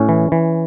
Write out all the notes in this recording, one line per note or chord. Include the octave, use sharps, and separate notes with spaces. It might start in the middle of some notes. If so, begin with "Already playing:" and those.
Already playing: A2 C#4
E3
E3